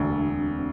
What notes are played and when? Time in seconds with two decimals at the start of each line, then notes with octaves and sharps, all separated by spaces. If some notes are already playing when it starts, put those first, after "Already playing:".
Already playing: E1 D2 D3
0.10 D4
0.30 C4
0.51 C4